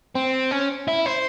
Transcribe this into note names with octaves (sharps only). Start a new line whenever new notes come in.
C4
C#4
E4
C5